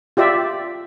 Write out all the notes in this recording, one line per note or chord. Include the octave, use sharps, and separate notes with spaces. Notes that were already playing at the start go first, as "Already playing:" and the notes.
F4 G4 D5 E5